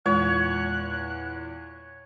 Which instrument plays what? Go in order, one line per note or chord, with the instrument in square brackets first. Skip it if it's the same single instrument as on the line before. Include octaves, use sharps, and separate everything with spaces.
[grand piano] E2 A#2 [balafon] G#3 [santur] C#5 [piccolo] F#6